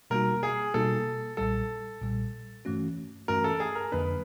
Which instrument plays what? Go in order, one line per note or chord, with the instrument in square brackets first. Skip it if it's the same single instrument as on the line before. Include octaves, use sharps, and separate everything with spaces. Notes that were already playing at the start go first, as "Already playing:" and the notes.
[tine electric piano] B2 G3 A#3 D#4 F#4 [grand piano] A#4
[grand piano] G#4
[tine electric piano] B2 G3 A#3 D#4 F#4 [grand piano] A4
[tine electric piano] B1 A#2 G3 [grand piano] A4
[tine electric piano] B1 A#2 G3
G2 E3 A3 C#4 F#4
[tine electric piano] G2 E3 A3 C#4 F#4 [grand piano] A#4
[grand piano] A4
G#4
A#4
[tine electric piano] F2 D3 F#3 A#3 D4 [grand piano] B4